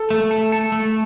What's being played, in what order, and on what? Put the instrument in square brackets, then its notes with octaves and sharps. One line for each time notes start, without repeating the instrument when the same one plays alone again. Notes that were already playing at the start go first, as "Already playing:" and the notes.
Already playing: [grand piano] A4
[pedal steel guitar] A3
A4
A4
A3